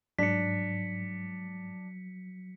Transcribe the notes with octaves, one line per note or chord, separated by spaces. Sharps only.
G#2 F#3 D4 B6 C#7